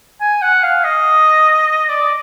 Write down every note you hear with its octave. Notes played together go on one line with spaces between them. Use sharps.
G#5
F#5
F5
D#5
D5